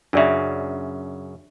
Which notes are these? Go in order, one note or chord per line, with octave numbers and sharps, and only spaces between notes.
F#2 C#3 D4 D5 E5